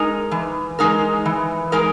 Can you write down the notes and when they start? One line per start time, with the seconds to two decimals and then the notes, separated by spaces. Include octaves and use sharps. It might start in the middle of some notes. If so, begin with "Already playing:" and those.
Already playing: G#3 D#4 A#4
0.31 E3
0.79 G#3 D#4 A#4
1.26 E3
1.72 G#3 D#4 A#4